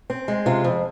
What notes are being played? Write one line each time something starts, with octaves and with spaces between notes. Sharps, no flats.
C4
G#3
C3 F4
F2